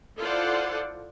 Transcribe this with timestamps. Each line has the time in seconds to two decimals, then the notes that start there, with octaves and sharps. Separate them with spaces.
0.18 E4 F4 A4 C5 D5 F#5